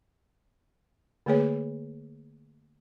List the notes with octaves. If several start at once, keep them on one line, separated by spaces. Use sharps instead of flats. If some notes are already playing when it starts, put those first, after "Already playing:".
D3 A3 A#3 G#4 B4 C#5